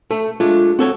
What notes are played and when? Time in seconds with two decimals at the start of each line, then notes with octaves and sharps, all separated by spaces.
0.11 A3
0.40 G#3 A3 D4 F4
0.79 C4 F#4 A4 C#5